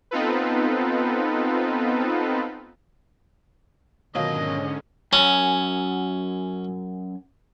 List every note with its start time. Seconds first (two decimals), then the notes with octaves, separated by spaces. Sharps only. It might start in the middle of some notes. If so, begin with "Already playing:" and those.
0.11 B3 C4 D#4 F4 A4 B4
4.15 G#2 B2 D3 D#3 F#3 C#4 F4 D#5
5.13 F#2 C#4 G#5